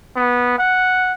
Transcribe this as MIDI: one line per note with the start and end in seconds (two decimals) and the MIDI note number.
0.16 0.55 59
0.58 1.13 78